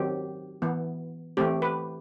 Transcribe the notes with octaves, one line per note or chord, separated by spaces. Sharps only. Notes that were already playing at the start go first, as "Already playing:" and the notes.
Already playing: D#3 F#3 C4 G4
E3 B3
E3 A3 C4 G4
B4